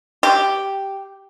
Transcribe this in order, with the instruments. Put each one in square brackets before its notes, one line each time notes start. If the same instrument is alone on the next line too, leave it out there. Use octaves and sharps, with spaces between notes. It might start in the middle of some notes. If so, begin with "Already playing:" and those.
[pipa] G4